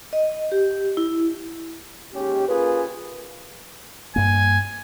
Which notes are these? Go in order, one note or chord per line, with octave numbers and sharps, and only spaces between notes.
D#5
G4
E4
D#2 G#3 C#4 G4
A#3 C#4 F4 G#4 A#4 B4
G2 A#3 G#5